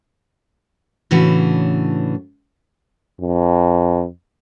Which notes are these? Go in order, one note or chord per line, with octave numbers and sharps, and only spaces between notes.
A2 C#3 E3 C#4 D4 F#4
F2